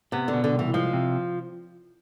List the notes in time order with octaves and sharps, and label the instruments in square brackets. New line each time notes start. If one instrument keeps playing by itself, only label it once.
[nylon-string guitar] C3 [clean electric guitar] B3
[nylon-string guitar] D3
[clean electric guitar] B2
[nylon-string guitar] D3
[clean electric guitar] C2
[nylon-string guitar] E3
[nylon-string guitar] F3 [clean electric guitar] G#3
[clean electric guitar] C3